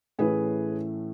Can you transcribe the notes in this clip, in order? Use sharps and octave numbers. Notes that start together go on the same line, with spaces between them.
A2 E3 A3 C#4 E4 G#4 B4